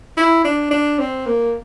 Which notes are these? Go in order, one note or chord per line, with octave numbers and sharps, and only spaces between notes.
E4
D4
D4
C4
A#3